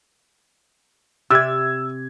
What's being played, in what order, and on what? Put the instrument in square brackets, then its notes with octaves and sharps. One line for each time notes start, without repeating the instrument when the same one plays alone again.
[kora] C3 D5 E5 [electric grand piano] E6 G#6